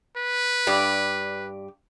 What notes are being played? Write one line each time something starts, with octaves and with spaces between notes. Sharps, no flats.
B4
G2 G4 D5